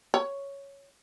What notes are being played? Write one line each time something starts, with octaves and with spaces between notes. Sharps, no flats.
C#5